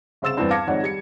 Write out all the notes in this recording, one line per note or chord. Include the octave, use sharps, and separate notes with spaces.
C2 C#3 C5 E6 A6 E7
E2 G2 E3 B3 C4 D4
F5 A5 D6 G#6 A#6 C#7
F2 G#2 D#3 C#5 D5 F#5
G3 G#6 C#7